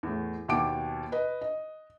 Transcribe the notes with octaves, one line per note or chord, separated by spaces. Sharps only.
E2 A2
D#2 B2 G5 D6 D7
B4 D#5
D#5